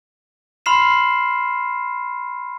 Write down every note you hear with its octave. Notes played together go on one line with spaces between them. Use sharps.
B5 C6 F6 C7 E7